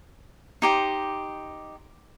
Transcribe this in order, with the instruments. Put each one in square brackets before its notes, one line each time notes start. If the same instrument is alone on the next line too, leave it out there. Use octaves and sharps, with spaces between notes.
[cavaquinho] D#4 G4 C5